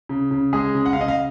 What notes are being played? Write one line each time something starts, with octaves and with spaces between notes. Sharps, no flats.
C#3
C#3
G#3 G#4
C#3
F#5
F5
C#3 D#5
F5